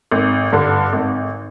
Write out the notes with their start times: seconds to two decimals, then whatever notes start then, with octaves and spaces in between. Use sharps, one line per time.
0.11 G#1
0.52 G2 D3
0.93 G#1